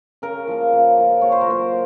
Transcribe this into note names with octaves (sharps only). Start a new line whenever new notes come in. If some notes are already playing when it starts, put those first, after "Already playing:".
C#3 A#4
F3 A#3
C#3
F3 A#3
A#2 C#5
C5
A#4
F#3 A#3 C5